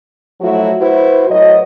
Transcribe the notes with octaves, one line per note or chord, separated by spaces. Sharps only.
F3 F#3 A3 E4 F#4
E4 F#4 B4 C5
A2 F#3 D#5